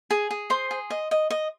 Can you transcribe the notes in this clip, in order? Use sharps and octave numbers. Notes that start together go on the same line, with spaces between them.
G#4
G#4
C5 C6
G#4
D#5
D#5
D#5